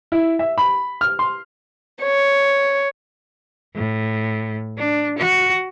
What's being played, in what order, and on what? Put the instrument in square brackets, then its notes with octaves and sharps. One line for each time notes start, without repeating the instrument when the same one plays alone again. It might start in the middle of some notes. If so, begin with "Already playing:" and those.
[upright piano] E4
E5
B5
F6
C6
[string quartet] C#5
[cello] A2
D4
F#4